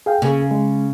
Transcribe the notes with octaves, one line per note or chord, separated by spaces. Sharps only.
G#4 F5 G5
C#3 A#3 G#4
G#3